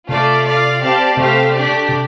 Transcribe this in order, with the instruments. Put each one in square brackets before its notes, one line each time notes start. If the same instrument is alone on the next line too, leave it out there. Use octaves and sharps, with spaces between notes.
[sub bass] C3 [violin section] A3 F4 D5 F5
[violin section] F4 D5 F5
C4 G4 D5 F5 A5
[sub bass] C3 [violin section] A3 C4 G4 F5
[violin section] A3 D4 G4 D5
[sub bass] C3